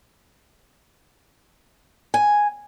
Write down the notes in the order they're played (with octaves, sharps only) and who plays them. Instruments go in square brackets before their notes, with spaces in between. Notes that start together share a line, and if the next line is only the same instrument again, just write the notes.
[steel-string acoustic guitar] G#5